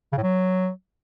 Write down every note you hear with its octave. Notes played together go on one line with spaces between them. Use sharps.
C#3
A2
F#3